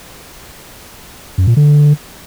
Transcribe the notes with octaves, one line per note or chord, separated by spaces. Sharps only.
F#2
A#2
D3